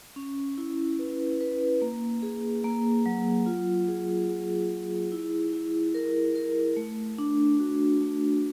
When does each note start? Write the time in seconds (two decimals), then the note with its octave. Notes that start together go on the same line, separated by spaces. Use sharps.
0.16 C#4
0.58 E4
0.99 B4
1.41 B4
1.82 A#3
2.23 G#4
2.64 A#3
3.06 F#3
3.46 F4
3.88 G#4
4.29 G#4
4.70 G#4
5.12 E4
5.53 E4
5.94 A#4
6.36 A#4
6.77 A3
7.18 D4
7.60 F#4
8.01 A3